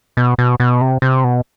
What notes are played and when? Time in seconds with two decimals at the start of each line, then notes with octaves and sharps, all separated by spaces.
0.17 B2
0.38 B2
0.60 B2
0.81 C3
1.02 C3
1.24 B2